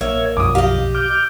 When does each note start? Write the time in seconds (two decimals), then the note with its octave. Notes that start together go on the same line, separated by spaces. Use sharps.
0.01 A#1 A#3 C#5 E5 G#6
0.37 B1 F#2 F3 D6 D#6
0.55 G4 D#5 F5
0.95 D6 F6 G6